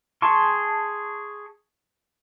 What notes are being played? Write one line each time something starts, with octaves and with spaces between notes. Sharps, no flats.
G#4 A5 C6 C#6